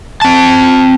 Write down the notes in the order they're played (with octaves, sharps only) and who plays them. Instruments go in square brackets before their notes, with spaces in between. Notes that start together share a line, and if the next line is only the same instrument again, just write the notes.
[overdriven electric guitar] C4 A5